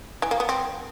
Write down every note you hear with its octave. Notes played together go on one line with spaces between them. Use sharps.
E3
A#3
B3
C4